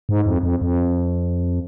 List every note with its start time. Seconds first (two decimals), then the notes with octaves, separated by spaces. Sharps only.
0.09 G#2
0.26 F2
0.43 F2
0.62 F2